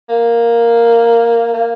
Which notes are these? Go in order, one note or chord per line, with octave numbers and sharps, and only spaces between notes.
A#3
A#3